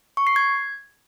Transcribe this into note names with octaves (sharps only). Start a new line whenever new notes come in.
C#6
C7
G#6